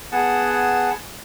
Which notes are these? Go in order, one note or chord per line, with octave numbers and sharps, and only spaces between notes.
B3 G#4 F#5 A5